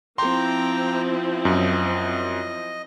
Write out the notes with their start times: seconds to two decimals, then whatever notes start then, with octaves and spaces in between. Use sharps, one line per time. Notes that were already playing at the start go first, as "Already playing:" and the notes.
0.18 F3 C4 E4 G5 A#5 C6 D6
1.45 F#2 D#5